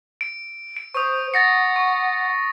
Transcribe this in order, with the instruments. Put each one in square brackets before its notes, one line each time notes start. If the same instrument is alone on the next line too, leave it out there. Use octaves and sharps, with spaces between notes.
[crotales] D7
D7
[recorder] C5 [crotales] C#6 D#6
[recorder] F#5 [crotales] A6 A#6 C#7
[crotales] C#6